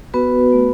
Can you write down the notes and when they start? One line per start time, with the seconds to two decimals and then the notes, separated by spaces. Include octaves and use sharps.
0.14 B3 F#4 B4
0.52 A3